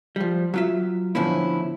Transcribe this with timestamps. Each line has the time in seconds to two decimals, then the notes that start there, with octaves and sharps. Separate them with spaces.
0.16 F3 G3
0.54 F#3 F4 E5
1.15 A2 D3 F3 B3 C#4 E4